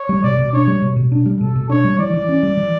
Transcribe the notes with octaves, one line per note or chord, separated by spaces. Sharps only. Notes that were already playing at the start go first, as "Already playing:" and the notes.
Already playing: C#5
G3
B2 D5
B2
D4 C#5
G3
B2
B2
D4
G3
B2 A4
B2
D4 C#5
G3
E3 D5
E3
C#4
G3
E3